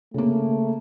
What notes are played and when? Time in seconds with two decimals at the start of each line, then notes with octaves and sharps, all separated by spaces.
0.14 C#3 A3 A#3